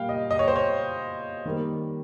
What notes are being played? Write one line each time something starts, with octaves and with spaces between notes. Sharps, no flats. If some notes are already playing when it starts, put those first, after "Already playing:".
Already playing: A#2 G3 A#3 F5 G5
D#5
D#5
C#5
C5
C#5
D#3 G3 A#3